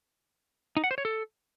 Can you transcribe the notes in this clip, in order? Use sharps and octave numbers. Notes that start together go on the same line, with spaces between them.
D#4
F#5
C5
C#5
A4